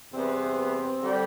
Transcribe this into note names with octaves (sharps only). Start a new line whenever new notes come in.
E2 C3 G3 B3 C4
D3 G3